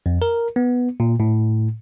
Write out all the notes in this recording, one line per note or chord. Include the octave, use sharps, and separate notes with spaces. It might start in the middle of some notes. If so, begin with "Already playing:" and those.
F2
A#4
B3
A#2
A2